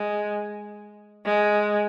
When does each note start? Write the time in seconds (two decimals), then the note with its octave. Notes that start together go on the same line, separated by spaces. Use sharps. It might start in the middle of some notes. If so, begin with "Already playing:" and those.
Already playing: G#3
1.26 G#3